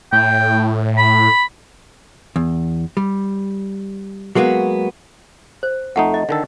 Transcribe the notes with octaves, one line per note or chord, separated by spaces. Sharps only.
A2 G5
B5
E2
G3
F#3 G#3 A#3 B3 F#4
C5
F2 A3 D#4 F#5
D#5
D3 D#3 A4